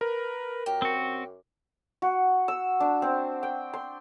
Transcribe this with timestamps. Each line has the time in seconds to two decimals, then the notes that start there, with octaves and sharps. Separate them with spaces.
0.01 A#4 B4
0.66 F#2 G4
0.82 C4 F#4
2.02 F#4
2.48 E6
2.80 D4
3.02 C4
3.43 G5
3.73 C6